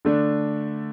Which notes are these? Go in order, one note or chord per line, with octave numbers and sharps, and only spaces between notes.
D3 A3 D4